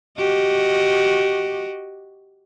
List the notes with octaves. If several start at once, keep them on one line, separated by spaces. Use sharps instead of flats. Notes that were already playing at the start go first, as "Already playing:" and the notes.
F#4 G4 D#5